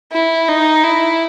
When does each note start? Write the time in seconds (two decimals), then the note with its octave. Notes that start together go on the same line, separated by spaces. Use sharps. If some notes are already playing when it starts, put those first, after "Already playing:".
0.12 E4
0.48 D#4
0.84 E4